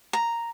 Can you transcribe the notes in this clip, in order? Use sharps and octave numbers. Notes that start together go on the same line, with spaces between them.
A#5